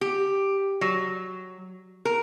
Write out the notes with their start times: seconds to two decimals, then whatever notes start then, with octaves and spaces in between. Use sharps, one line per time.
0.01 G4
0.81 F#3
2.05 A#4